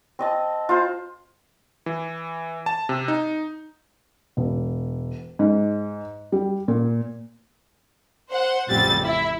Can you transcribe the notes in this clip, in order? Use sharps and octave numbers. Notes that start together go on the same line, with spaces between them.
C4 D#5 A5
F4 C5
E3
A5
C3
D#4
E1
G#2
G3
A#2
C5 F#5
A1 F2 C#3 G3 C4 A6
E4